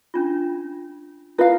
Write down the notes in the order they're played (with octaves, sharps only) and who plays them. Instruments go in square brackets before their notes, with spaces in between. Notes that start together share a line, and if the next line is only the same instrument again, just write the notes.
[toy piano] C#4 D4 F4
[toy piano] E4 F4 E5 [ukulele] B4 F5